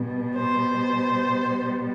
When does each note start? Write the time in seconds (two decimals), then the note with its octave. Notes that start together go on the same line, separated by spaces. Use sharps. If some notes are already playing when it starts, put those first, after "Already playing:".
Already playing: B2 G3
0.35 C5